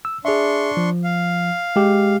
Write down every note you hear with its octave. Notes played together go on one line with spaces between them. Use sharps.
E6
D4 G#4 E5 C6 C#6
F3
F5
G#3 G4